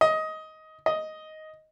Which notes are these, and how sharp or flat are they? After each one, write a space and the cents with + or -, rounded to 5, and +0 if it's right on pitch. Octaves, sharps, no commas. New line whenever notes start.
D#5 +15
D#5 +5